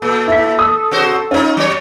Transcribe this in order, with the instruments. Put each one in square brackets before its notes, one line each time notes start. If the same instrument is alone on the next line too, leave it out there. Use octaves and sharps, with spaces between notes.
[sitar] A#2 [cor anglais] A4
[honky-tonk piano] E4 B6
D#6
[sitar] C3 F#4 C5
[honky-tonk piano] C#4 [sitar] D#4 F4
[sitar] F#3 C#5